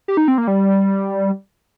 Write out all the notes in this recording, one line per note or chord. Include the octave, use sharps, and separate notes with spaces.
G4
D#4
C4
A#3
G3